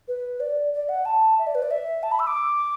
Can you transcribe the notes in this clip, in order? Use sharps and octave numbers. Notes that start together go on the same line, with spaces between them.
B4
D5
D5
F#5
A5
E5
D5
B4
D5
E5
A5
B5
E6
D6